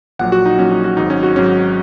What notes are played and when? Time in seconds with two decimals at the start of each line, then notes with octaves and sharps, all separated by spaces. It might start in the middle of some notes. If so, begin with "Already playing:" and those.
0.19 A#1 A#2 F#3 F#5
0.32 F#4
0.46 D#4
0.58 A#1 A#2 F#3 C#4
0.71 D#4
0.84 F#4
0.97 G#1 G#2 F#3 D#4
1.10 C#4
1.23 F#4
1.35 G#1 G#2 F#3 C#4